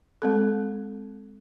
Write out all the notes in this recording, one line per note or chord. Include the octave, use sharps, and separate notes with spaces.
G#3 C4 A4